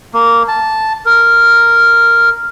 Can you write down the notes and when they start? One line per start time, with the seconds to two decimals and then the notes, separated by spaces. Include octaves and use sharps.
0.14 A#3
0.48 A5
1.06 A#4